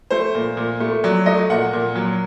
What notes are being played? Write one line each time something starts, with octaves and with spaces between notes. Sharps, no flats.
A3 C5
A#2
A#2
A3
F#3 D5
A3 D#5
A#2 F#5
A#2
F#3